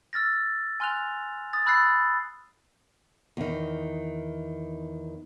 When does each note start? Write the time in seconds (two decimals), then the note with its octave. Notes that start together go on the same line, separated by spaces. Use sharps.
0.13 E6 F6 A6 A#6
0.80 G#5 C6 F6 F#6 F7
1.53 D#6 A6
1.66 B5 E6 F#6 A6 C7
3.37 E2 D#3